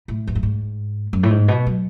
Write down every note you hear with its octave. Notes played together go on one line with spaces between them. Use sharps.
A2
E2
F#2
G#2
F#2
A2
G#2
B2
F#3